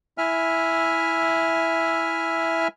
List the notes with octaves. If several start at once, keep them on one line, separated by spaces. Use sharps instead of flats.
E4 E5 G#5 F6